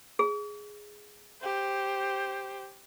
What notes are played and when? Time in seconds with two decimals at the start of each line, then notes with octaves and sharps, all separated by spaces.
0.19 G#4
1.41 G4 C5